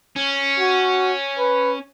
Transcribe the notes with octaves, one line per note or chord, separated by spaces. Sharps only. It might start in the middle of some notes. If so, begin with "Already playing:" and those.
C#4
F#4
B4